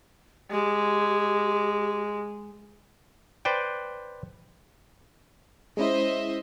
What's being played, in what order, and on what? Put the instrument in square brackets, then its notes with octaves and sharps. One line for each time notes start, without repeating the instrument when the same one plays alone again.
[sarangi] G#3 [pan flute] G4
[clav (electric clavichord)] B4 C5 D5 G5
[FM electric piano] G#3 C#4 E4 [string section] C5 D#5 E5